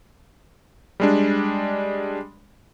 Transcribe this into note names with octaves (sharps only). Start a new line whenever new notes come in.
G3 G#3 D4